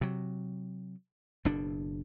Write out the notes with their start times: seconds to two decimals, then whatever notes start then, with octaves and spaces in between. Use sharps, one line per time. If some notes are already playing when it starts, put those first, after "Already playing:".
0.01 C3 F#3
1.45 F#1 B2 D4